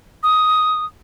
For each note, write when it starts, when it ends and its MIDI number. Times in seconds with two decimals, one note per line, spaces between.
0.23 0.85 87